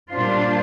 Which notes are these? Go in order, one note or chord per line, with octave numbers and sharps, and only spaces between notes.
A#2 G3 D4 F4 C5